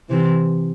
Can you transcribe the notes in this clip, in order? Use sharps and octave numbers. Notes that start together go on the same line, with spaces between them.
C3 E3